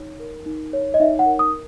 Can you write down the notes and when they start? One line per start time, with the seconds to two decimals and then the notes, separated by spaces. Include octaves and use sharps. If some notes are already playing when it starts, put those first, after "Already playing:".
Already playing: D#4 C#5
0.19 A#4
0.46 D#4
0.73 C#5
0.94 D#5
1.00 D#4 E5
1.19 F#5
1.26 A#4
1.39 D#6